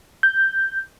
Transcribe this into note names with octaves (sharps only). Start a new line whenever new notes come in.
G6